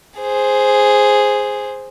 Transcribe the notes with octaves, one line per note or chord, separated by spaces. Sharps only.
G#4 C5